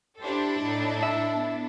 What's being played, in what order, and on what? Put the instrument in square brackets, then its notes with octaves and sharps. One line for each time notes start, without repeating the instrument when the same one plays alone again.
[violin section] D4 E4 A4 [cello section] G4 C5
[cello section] A2 D#4
[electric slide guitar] E5
[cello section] B3